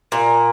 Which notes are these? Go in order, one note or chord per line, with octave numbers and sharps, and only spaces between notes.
A#2